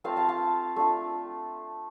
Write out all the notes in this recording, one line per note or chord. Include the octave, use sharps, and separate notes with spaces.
A3 C4 F4 F5 A5
F5 A5
F5 A5
A3 D4 F4